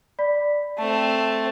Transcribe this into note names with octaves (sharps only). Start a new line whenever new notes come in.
D5 B5 B6
A3 C4 A5